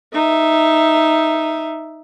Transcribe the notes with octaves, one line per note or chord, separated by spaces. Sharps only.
D#4 E5